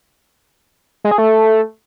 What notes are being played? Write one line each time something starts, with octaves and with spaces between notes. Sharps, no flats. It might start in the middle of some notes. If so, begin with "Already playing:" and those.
G#3
G#4
A3